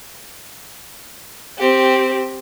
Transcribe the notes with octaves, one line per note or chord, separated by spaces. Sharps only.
C4 G4